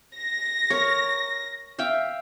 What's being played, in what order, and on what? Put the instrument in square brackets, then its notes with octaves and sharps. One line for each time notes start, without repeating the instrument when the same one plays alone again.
[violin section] A#6
[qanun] A#4 C#5
E5 F5 G5